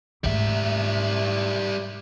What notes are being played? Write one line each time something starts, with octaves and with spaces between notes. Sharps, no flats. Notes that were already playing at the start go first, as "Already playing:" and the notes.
G#2 G3 A3 E5